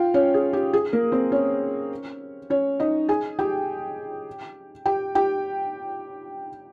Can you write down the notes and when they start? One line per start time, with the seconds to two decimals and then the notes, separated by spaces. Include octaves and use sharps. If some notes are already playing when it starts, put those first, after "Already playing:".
Already playing: F4 F5 G5
0.14 C#4 C#5
0.34 G#4
0.53 G4
0.73 G#4
0.93 A#3 A#4
1.12 C4 C5
1.32 C#4 C#5
2.50 C#4 C#5
2.80 D#4 D#5
3.09 G#4 G#5
3.39 G4 G5
4.86 G4 G5
5.15 G4 G5